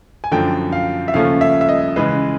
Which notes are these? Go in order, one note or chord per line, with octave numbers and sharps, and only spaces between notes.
G#5
F#2 D3 F3 A3 G5
F5
E5
D#2 C#3 F3 A3 C#4 F5
E5
E5
D#5
C#3 E3 G#3 B4